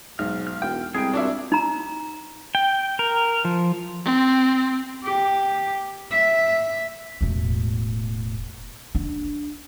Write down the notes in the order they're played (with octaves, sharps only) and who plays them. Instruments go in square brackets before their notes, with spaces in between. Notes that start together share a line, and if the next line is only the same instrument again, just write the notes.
[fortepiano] B1 [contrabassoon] G#2 [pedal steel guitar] F6
[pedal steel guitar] F6
[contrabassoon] E1 [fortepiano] G5
[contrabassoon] C2 [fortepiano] G#3 [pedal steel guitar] G#4 G5
[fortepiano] D4 D5 E5 [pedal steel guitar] F4 F#4 A#4
[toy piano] D#4 A#5
[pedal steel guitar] G5
A#4
F3
[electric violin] C4
[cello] G4
E5
[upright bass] E1 A2
D4